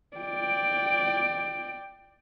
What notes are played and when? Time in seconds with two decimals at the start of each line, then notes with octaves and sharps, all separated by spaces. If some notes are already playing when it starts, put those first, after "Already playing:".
0.17 D5 G5